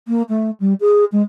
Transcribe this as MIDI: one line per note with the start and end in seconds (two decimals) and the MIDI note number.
0.08 0.22 58
0.29 0.50 57
0.60 0.73 55
0.80 1.04 68
1.12 1.22 56